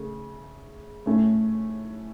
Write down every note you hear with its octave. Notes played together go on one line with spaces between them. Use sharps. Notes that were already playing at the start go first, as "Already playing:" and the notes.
Already playing: C#3 A3
A2 A3 C#4